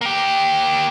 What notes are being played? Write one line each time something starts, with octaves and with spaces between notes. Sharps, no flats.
A#3 G4